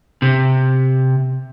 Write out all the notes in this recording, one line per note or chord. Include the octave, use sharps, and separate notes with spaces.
C3